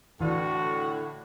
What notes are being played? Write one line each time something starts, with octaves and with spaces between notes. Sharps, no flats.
A2 D3 E3 F#4